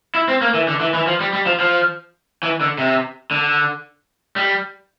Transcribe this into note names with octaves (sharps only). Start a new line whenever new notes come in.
E4
C4
A#3
E3
D3
E3
E3
F3
G3
G3
F3
F3
E3
D3
C3
D3
G3